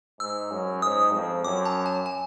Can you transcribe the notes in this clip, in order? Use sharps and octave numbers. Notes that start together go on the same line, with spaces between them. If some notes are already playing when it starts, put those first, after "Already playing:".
G#2 E6
F#2
G#2 D#6
F2
F#2 D6
A5
G#5
G#5